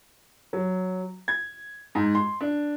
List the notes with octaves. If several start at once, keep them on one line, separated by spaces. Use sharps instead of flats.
F#3
G#6
G#2
C6
D4